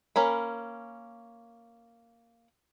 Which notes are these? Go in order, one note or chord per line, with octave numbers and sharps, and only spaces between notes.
A#3 C#4 B5